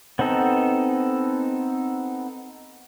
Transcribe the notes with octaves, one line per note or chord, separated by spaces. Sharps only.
B3 C4 D#4 A4